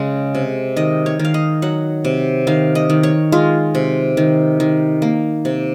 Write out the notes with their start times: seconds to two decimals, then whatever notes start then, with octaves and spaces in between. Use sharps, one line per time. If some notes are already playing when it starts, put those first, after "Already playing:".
Already playing: C#3 G#3
0.35 C3
0.77 D#3 D#5
1.06 C#5
1.19 D#3
1.25 F5
1.34 D#5
1.62 F#3 F#5
2.05 C3
2.47 D#3 F5
2.75 D#5
2.90 D#3
3.03 C#5
3.32 G#3 F4
3.75 C3
4.17 D#3
4.60 D#3
5.02 A#3
5.45 C3